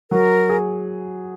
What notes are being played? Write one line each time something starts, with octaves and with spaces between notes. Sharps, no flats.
F#3 A#4
G#4